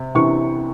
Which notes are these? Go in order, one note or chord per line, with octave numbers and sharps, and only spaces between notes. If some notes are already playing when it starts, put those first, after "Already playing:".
Already playing: C3
C3 E3 C#6